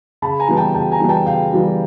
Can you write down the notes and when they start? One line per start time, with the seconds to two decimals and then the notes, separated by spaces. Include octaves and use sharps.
0.22 C#3 A5 B5
0.40 G#5 A#5
0.48 E3 G3 B3
0.57 G5 A5
0.74 C#3 G5 A5
0.92 G#5 A#5
1.00 E3 G3 B3
1.09 G5 A5
1.26 C#3 F5 G5
1.52 E3 G3 B3